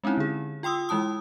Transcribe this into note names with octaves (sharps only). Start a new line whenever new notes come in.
G#3 C4 C#4 D#4 E4
D3 G#4
F4 G5 C6 D#6 E6
E3 G#3 E4 A5 D#6